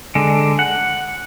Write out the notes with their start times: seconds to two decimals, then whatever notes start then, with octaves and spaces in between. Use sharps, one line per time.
0.15 D3 G#3
0.59 F#5